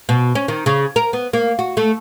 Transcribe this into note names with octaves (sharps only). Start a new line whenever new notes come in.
B2
C#4
D#3
C#3
A#4
B3
A#3
F#4
A3